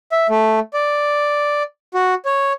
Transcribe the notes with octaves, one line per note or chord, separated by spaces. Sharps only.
E5
A3
D5
F#4
C#5